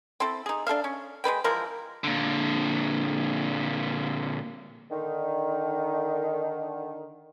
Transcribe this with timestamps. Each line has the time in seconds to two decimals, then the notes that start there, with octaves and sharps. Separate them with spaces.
0.20 C4 E4 A4
0.46 D#4 G#4
0.67 D4 A4 E5 F5
0.84 C#4
1.24 G#3 D4 B4 G5
1.44 E3 F3 G#3 A#4
2.04 A#2 D3
4.91 D3 D#3